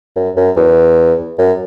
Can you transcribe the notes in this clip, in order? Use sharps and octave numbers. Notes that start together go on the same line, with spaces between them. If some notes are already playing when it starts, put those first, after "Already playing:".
F#2
F#2
E2
F#2